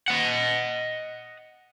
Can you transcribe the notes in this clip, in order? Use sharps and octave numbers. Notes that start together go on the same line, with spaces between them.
D#5 F#5